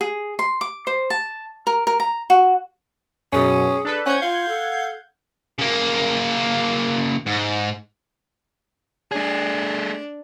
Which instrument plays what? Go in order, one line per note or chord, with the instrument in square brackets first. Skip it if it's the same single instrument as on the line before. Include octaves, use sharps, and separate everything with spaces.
[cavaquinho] G#4
C6
D6
C5
A5
A#4
A#4
A#5
F#4
[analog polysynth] F#2 B2 [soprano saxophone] C#4 [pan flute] G#4
[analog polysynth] D4 A4 B4
[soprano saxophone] C#4 [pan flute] C5 [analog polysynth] F#5 G6 G#6
[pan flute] F4 [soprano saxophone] F5
[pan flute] A4
[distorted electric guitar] C#3 A#3
G#2
[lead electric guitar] A3 G#4 [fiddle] D4